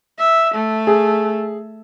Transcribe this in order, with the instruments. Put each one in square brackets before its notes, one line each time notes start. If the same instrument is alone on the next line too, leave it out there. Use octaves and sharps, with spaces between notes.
[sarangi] E5
A3
[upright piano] G#4